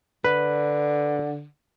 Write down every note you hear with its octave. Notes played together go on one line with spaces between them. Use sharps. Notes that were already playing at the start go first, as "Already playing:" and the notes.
D3 B4